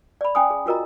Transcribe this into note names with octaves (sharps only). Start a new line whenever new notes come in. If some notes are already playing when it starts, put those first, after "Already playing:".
D5 B5
C#4 G5 G#5 C6 D#6
G#4
F4 F#4 A#4 D#5 A#5